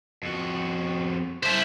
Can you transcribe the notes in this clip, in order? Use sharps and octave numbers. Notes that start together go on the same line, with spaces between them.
F2 F#4
E4 C5